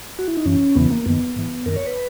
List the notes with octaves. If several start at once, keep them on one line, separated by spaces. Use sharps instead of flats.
F#4
E4
D#4
F#2 E3 C#4
E2 C#3 E3 B3
A#3
F#2 D#3 B3
G#2 E3
F#2 D#3 A#4
C#5
B4